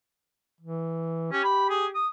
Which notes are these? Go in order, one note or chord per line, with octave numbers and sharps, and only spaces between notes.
E3
C#4 G4
B5
G#4
D#6